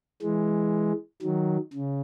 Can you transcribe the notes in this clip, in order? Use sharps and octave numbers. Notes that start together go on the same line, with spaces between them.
E3 G#3
D#3 F#3
C#3